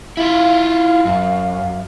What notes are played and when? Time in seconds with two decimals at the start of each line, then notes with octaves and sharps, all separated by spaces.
0.17 E4 F4 F5
1.05 F#2